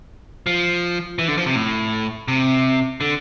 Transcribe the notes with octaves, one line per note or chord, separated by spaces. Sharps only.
F3
E3
D3
F3
C3
A2
C3
D3